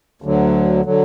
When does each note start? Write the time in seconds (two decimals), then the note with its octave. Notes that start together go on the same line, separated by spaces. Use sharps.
0.22 D2 D3 F#3
0.85 D3 F#3